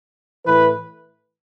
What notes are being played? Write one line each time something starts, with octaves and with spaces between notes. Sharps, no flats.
A2 E3 B4